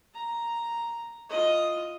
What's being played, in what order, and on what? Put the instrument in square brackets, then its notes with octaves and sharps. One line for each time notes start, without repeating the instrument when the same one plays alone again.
[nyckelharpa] A#5
F4 D#5